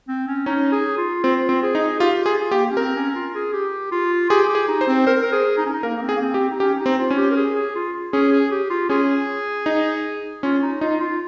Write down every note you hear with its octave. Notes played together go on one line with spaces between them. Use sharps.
C4
C#4
C#4 D#4
G#4
F4
C4 F4
C4
G#4
D#4
F4 G4
F4 G#4
A#3 G4
C#4
C4 A#4
C#4
F4
G#4
G4
F4
G4 G#4
G4
G#4
D#4
C5
C4
A#4 C5
A#4
G#4
D#4
C#4
D#4
A#3 A#4
A#3
C4
G#4
A#3
C4
G4
C4
D#4
C#4 G4
D#4
C4
F4
C#4
G4
A#4
G#4
G#4
F4
C#4 G#4
G#4
G4
F4
C#4 G#4
D#4
C#4 F4
D#4
D#4 F4
F4